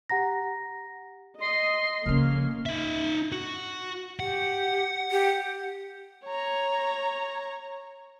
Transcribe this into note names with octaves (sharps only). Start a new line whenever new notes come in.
G4 F#5 A#5 A#6
D#5 C6
C#3 F3 A#3 C#4 F6
D#4 E5
F#4
G4 F#5
G4
C#5 A#5